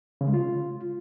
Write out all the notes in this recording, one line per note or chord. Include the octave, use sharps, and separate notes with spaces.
C#3
G#3
F4